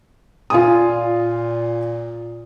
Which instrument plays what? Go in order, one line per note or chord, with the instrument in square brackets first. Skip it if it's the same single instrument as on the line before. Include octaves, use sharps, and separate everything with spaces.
[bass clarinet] A#2 [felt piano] F4 G#5 D#6